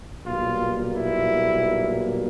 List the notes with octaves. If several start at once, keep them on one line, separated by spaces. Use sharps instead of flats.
B1 A#2 G3 A#3 F4
E4